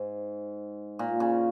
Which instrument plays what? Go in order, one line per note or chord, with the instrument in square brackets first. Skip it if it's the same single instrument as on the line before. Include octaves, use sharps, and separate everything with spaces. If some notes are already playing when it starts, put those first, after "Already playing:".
Already playing: [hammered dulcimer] G#2
A#2
C#3